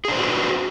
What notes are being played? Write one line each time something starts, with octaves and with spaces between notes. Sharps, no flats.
D4 F#4 G#4 B4 C5